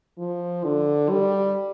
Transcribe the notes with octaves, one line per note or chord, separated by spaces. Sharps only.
F3
D3
G3